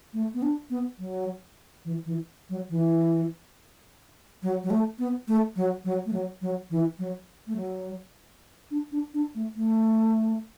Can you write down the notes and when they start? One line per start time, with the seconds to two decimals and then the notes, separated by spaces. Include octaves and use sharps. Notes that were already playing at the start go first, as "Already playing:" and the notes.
0.13 A3
0.34 B3
0.42 D4
0.70 B3
0.99 F#3
1.85 E3
2.06 E3
2.50 F#3
2.70 E3
4.43 F#3
4.64 F#3
4.70 A3
4.99 B3
5.28 A3
5.56 F#3
5.84 F#3
6.06 A3
6.13 F#3
6.42 F#3
6.70 E3
6.99 F#3
7.47 A3
7.56 F#3
8.71 D4
8.92 D4
9.14 D4
9.35 A3
9.56 A3